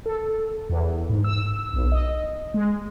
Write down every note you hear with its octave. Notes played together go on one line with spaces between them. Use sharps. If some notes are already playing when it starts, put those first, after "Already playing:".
A4
E2
G#2
E6
B1
D#5
G#3